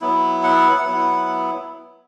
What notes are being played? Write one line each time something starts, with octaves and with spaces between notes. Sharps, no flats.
F#3 B3 E4
F#5
F#3 B3 E4 F#5